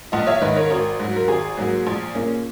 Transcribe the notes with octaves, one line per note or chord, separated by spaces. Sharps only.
A#1 D#5 F#5
C#5 E5
G#2 D#3 B4 D#5
A#4 C#5
G#1 A#4
G#2 F#3
A#4
G#1 G#4
G#2 F#3 A#3
A#1
A#2 A#3 C#4